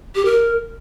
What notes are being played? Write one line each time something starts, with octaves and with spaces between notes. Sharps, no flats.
G4
A#4